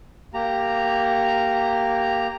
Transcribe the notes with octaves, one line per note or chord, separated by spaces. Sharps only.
A#3 G4 A#5